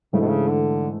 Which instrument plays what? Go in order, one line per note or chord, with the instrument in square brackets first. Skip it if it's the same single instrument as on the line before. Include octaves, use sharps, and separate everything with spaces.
[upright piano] G#2 E3 A3 D4 A4 [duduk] C#3
[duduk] B2
C#3
D3